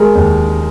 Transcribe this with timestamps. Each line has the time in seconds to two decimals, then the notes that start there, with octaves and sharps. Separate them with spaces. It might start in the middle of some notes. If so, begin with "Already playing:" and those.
Already playing: G#3 A#4
0.15 D#2